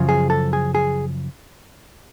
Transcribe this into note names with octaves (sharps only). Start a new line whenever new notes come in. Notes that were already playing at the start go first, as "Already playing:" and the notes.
Already playing: F#2 C#3 F3
G#4
A4
G#4
G#4